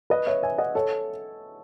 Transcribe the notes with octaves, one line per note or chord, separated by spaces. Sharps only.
B4 D#5
C#5 E5
E5 G#5
D#5 F#5
A4 C#5